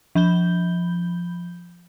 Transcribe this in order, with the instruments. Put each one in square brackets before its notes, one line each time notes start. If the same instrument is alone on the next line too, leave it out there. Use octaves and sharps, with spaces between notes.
[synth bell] F3 B5 G6 G7